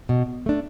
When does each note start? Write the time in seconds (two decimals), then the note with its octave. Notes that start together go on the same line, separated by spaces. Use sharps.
0.09 B2
0.46 A3 D4